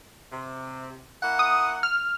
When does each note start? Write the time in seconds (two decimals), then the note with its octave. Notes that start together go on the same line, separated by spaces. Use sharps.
0.32 C3
1.23 A#3 E4 F#5
1.39 D#6
1.83 F6